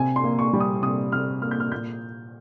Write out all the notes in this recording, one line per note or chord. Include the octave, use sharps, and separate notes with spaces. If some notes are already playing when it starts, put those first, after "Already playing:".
Already playing: C3 G#5
C6
A#3
C#6
G3
D#6
C3 D#6
C3 F6
A#3 F6
G6
F6
A#2 G6